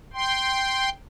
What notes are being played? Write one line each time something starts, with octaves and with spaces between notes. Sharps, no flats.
G5 C6